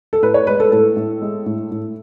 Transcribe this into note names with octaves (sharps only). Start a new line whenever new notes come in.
A4
A2 B4
C#5
G#3 B4
A4
A2 A4
A2
G#3
A2
A2